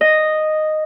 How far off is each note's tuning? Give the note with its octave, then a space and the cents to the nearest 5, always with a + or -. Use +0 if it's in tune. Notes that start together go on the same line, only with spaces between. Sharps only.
D#5 -5